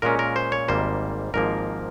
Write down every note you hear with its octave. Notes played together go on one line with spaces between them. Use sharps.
A#2 G#3 C#4 A#4
A#4
C5
C#5
G#1 G#2 G3 A#3 C5
G#1 G#2 F3 A#3 A#4